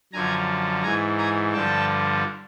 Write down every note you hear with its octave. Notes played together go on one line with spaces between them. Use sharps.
F#2 D3 F3 G#5 A#5
G#2 E3 G#5 A#5
G#5 A#5
G2 D3 F3 G5 A5